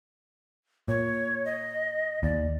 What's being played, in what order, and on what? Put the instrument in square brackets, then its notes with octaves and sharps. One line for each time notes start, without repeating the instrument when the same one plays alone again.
[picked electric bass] A#2 [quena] C#5
[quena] D#5
[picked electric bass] D#2 [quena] D5